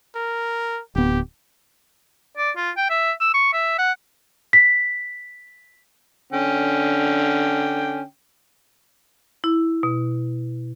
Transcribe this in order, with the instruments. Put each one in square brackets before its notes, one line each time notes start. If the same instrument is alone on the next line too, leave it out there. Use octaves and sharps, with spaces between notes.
[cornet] A#4
[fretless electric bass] D1 B3 [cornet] G4
[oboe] D5
F4
G5
E5
E6
C#6
E5
F#5
[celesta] B6
[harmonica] D3 C#4 G5
[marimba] E4
B2